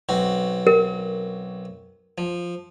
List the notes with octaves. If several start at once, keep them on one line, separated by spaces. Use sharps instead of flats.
B1 C4 F#4
A#4
F3